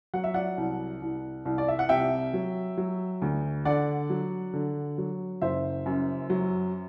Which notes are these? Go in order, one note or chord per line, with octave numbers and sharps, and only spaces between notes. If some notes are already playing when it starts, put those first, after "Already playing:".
F#3 F#5
E5
D5 F#5
C2
C2
C2
D5
E5
F#5
C3 E5 G5
F#3
F#3
D2
D3 D5 F#5
F#3
D3
F#3
F#1 C5 E5
F#2
F#3